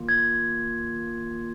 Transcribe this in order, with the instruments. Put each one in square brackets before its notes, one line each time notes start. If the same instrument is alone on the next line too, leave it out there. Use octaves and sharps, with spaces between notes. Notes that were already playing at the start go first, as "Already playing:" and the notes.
Already playing: [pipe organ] D#3 A#3 F4
[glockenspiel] G#6